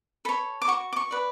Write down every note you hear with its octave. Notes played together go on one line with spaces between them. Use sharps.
A4 C#5 B5
D6
F#4 C#6
D6
C#6
B4 D5